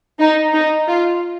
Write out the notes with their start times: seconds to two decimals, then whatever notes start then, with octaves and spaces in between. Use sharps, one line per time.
0.20 D#4
0.53 D#4
0.88 F4